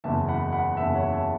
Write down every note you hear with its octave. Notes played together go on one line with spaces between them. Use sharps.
F#1 E2 C#3 E5 A5
F#5 B5
F#5 B5
F#1 E2 C#3 E5 A5
C#5 F#5
E5 A5